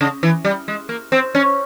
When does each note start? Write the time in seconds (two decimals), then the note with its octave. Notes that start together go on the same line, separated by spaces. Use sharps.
0.01 C#3
0.23 E3
0.45 G3
0.68 G#3
0.89 A#3
1.12 C4
1.35 C#4